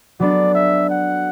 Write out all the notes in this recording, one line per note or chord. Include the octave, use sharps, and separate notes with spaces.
F#3 B3 D4 A4 D5
E5
F#5